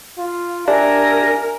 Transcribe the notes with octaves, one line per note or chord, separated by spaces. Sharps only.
F4
D4 G4 A#4 E5 G#5 A#6